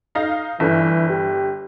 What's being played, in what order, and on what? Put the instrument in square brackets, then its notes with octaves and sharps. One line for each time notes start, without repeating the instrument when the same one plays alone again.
[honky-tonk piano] D#4 F5 A#6
[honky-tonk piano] G1 [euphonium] E3
[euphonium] G4